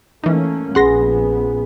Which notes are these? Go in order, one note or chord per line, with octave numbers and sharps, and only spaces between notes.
E3 A3 A#3 C#4 D#4
A#1 B3 C#4 G#4 F#5 C6 A#6